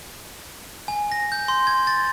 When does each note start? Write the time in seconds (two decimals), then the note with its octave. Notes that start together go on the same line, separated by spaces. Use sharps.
0.88 G#5
1.12 A#6
1.32 G6
1.48 C6
1.67 G#6
1.87 A6